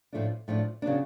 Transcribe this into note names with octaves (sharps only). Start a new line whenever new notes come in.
A2 F3 A3 D4
A2 F3 A3 D4
C#3 F#3 B3 D4